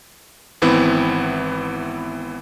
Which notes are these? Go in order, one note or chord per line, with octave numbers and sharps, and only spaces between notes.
G#1 E3 B3 C4 E4